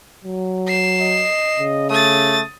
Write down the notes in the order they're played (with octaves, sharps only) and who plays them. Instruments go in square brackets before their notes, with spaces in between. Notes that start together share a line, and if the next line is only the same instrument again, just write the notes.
[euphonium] F#3
[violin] C7 E7
[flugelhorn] D#5
[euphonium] C#3
[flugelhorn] A3 [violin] D#6 A6